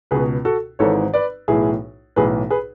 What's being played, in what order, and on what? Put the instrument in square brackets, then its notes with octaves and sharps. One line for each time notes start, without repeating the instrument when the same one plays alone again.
[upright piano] C#2 B2 G#4 B4
F#4 A4
G#1 G#2 E3 A4 C#5
B4 D5
B1 A2 E3 E4 G#4
B1 A2 E3 G#4 B4
G#4 B4